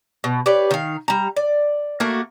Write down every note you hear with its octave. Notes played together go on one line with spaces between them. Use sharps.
B2
G4 B4 C#5 D5
D#3 F5
G3 A#5
D5
A3 A#3 F#4 A#4